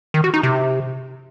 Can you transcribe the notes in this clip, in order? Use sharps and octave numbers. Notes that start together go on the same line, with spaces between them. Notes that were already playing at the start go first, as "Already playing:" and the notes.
D#3
F#4
D#4
C3